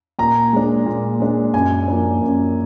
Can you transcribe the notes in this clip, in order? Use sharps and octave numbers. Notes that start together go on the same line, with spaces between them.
A#2 A#5
G#3 D4
A#2
G#3 D4
F#2 G#5
F3 A#3 D4
F#2